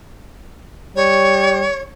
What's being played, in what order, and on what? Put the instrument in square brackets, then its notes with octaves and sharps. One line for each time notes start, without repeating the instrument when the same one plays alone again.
[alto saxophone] G3 [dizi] C#5